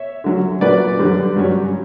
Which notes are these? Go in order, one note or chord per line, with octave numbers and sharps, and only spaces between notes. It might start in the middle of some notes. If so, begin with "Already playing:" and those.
Already playing: C#5 E5
D3 F#3 C#4
A#2 F#3 C#4 B4 D5
F#2 D3 G3
G2 F#3 C#4